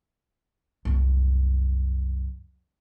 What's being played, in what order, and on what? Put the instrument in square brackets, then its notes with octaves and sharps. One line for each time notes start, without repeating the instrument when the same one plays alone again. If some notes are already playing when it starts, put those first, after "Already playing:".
[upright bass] C2 F#2